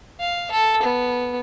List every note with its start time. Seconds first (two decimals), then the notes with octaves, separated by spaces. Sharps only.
0.20 F5
0.51 A4
0.83 B3